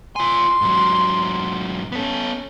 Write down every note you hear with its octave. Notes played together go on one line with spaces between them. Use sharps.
F4 G#5 C6
G#2 F#3
B3 C#4 A4